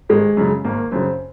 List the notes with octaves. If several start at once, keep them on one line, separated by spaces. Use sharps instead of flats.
G#1 G#3
F#2 C#3
G#1 A#3
F#2 C#3 C4